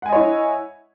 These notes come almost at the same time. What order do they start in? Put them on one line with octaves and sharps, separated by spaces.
F#5 G#5 D#5 C#5 E4